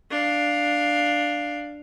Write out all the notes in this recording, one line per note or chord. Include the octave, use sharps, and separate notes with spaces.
D4 F5